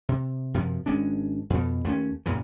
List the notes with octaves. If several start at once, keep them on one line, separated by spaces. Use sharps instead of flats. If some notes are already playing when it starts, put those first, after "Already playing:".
C3
F#2 C3 F3
G#1 G#3 C#4 D4
F2 B2
D#2 A3 B3 C#4
F#2 A#2 C#3 E3